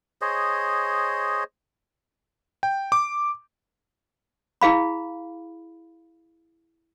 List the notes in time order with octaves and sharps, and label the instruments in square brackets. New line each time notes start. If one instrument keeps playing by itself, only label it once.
[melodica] G#4 C5 C#5 D#5
[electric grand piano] G5
D6
[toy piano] E4 G#4 F5 B5